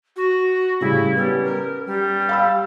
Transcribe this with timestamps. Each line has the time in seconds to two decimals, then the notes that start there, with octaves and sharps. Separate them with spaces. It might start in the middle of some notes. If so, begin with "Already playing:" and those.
0.16 F#4
0.81 A2 C#3 G3 E4
1.17 G3 B3 C#4
1.44 A#4
1.86 G3
2.29 F5 B5 E6